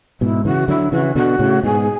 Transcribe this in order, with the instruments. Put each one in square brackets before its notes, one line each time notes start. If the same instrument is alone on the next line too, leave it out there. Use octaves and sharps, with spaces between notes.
[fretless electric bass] G#2 B2 [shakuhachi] E4
[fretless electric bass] C#3 E3 [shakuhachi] F#4
[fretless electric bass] D3 F#3 [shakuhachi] E4
[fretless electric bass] C#3 E3 [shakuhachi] F#4
[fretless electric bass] B2 D3 [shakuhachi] F#4
[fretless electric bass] A2 C#3
[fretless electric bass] G#2 B2 [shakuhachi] G#4